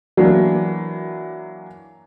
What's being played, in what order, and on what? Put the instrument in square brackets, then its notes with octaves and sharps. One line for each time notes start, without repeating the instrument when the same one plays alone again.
[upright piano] E3 F#3 A#3 D4